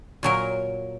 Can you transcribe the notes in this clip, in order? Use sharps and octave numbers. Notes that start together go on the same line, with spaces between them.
A#2 F#3 A#4